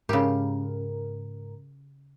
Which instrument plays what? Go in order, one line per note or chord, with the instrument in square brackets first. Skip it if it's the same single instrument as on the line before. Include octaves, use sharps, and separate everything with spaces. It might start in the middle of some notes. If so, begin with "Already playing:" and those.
[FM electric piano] G#2 A#4 [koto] C#3 G4